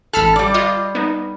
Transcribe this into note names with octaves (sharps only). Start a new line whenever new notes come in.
A1 A4 B5 F6
G3 D5
F4 D#5
B3 D#4